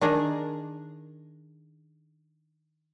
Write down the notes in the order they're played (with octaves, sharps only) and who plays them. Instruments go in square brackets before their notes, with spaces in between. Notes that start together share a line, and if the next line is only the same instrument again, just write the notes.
[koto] D#3 D4 G#4 A#4